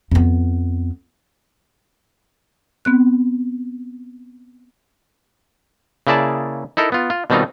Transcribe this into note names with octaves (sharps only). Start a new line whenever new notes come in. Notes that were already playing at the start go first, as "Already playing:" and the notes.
F2 B3
B3 C4 F#6
C#3 A#3 E4 G#4 D5 A5
D#4 E4 A4 A#4
B3 F4
F4
B2 D#3 G3 C4 D#4 F4